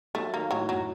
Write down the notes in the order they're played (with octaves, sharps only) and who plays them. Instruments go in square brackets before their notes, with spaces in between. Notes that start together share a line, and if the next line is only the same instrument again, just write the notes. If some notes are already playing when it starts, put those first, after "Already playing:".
[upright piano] F#3 [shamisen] A3
[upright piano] D#3 [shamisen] A#3
[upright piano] A2 [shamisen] F#3
[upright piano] F#2 [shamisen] F#3